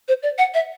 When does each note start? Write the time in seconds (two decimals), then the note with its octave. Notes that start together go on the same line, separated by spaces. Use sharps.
0.08 C5
0.23 D5
0.38 F#5
0.54 E5